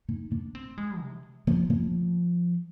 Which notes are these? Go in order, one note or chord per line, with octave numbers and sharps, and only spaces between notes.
D#4
D4
C4
G#3
C3
F3
F3